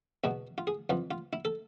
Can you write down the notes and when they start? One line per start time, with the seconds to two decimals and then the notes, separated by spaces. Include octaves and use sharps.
0.24 E2 B2 E4
0.58 F4
0.67 G#4
0.90 F2 E3 F4
1.11 F4
1.33 E4
1.45 A4